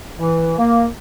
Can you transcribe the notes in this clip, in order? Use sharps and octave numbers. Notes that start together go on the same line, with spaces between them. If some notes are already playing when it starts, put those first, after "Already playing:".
E3
A#3